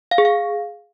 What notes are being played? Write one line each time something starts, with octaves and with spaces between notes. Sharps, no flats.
F5
G#4
F5